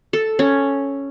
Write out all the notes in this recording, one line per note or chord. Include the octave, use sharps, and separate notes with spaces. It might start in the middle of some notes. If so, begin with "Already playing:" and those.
A4
C#4